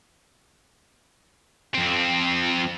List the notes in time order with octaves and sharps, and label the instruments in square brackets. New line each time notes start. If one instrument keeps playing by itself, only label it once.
[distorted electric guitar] F2 C4